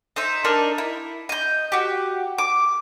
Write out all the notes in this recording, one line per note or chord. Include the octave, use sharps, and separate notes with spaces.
D#4 C5 E5
D4 D#4 A#4
E4
D#5 G6
F#4 G4
D6